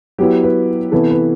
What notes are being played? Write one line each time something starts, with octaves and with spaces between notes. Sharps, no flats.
F#3 B3 E4 G4
B4
C3 E3 B3 E4 A4
B4